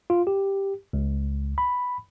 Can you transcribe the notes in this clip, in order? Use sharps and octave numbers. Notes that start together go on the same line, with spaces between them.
F4
G4
C#2
B5